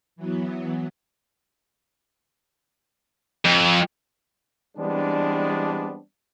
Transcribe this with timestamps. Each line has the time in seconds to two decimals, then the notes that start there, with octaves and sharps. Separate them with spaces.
0.16 E3 F#3 B3
3.45 F2
4.78 E3 G3 G#3 B3 C4 D4